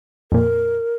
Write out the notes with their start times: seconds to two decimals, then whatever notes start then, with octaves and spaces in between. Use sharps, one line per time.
0.32 F2 A#2 A#4